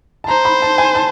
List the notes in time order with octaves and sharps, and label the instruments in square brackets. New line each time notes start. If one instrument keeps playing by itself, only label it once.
[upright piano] A5
[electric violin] C5 [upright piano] A#5
[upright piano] B5
A5
G#5
A5